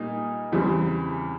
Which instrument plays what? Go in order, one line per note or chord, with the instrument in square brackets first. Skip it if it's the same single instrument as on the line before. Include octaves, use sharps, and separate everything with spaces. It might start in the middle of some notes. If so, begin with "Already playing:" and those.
Already playing: [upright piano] A#2 G3 A#3 D#4
E2 C#3 E3 G3 C4